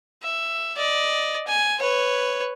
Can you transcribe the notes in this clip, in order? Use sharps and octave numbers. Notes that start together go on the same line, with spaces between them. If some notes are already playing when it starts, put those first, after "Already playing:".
E5
D5 D#5
G#5
B4 C#5